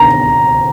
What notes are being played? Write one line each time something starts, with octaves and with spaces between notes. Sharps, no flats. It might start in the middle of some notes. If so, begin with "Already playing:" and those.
Already playing: A#5